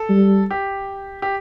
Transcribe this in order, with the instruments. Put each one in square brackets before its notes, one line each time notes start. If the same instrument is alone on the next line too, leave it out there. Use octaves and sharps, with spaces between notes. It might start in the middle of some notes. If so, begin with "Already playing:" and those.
Already playing: [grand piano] A4
[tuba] G3
[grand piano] G4
G4